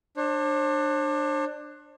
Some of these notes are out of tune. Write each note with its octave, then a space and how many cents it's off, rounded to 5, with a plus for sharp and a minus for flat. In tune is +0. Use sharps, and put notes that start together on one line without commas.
D4 +20 C5 +45